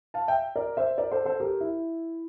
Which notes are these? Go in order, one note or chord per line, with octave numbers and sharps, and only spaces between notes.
F5 A5
E5 G5
A#4 D5
C5 E5
A#4 D5
A4 C5
A4 C5
G4 A#4
E4